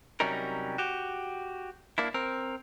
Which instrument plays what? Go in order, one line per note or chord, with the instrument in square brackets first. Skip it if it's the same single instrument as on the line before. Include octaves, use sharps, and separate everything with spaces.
[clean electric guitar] C3 F#3 G3 C#4 D#4 A#4
F#4 G4
A#3 D4 E4
C4 A#4